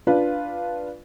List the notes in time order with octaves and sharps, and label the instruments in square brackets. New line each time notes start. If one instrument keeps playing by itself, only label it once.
[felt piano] D4 F4 B4